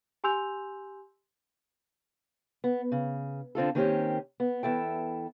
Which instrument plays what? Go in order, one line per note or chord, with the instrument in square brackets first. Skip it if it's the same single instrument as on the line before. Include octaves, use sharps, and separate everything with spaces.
[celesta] G4 G#5 C6 E6 G6 F7
[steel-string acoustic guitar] B3
C#3
D3 C4 F4 A4
D#3 A#3 C4 C#4 G4
B3
E2 E4 A4 G5